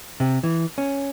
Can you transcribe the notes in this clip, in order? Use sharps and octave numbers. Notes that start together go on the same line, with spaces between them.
C3
E3
C#4